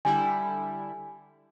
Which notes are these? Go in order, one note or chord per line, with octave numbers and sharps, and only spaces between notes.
D3 G3 E4 G#5